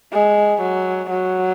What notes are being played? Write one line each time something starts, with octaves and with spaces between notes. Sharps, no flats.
G#3
F#3
F#3